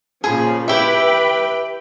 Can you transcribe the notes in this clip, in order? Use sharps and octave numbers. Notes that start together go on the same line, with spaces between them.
A#2 C#3 F3 G#4 B5
E4 G4 B4 E5 G5 B5